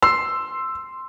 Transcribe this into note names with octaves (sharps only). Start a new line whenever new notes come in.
C6 E6